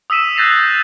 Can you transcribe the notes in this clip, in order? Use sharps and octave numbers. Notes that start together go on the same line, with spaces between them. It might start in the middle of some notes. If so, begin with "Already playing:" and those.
D#6 E6 B6 D#7 E7
F#6 G6 A6 A#6 C7 F7